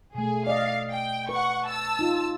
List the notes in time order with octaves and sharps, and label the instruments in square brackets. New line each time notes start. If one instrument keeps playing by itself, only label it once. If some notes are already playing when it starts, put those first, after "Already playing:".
[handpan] B2 A3 [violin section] G#4
[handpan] D5 D#5 [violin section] F5
[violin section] G5
[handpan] B4 [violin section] F#5 C#6
[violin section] A5 E6
[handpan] D#4 F4